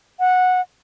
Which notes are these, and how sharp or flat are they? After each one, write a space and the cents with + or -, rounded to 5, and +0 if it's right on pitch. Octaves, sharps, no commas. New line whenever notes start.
F#5 -15